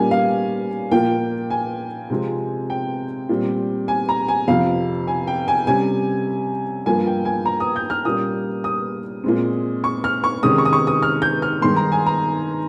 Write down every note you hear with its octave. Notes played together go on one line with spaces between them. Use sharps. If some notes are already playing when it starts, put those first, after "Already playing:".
Already playing: A#2 G3 A#3 C#4 G#5
F5
A#2 F3 A#3 G5
G#5
C3 F3 G#3 C4
G5
A#2 G3 C4
G#5
A#5
G#5
F2 C3 F3 F5
G#5
G5
G#5
C3 G3 C#4 G#5
G2 F3 A#3 G#5
G5
G#5
A#5
D#6
G6
F6
A#2 G3 A#3 C#4 D#6
D#6
A#2 G#3 C4
C#6
F6
C#6
C3 D#3 G#3 C#4 D#6
C#6
D#6
C#6
D#6
F6
G6
F6
G2 D#3 G#3 C6
A#5
G#5
A#5